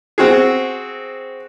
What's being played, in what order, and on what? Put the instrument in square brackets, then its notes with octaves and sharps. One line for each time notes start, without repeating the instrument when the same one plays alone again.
[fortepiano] C4 F#4 G#4